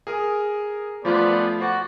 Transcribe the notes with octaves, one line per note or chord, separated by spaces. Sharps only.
G#4 A#4 D#6
F3 A3 B3 F4 C5 D5
F#4 C5 D6 A6